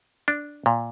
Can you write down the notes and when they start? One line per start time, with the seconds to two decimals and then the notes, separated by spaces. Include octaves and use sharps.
0.28 D4
0.66 A#2